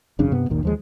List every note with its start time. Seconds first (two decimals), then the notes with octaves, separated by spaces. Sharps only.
0.19 G#1 F#2 C#3 D4
0.31 G2 C3 B3
0.50 G#1 D#2 A#2 D#3
0.63 D#2 F3 G#3